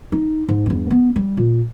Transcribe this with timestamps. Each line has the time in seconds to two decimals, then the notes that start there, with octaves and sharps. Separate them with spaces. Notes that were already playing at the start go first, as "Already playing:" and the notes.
0.12 D#4
0.49 G#2
0.66 E2 G2
0.91 B3
1.16 G3
1.37 A#2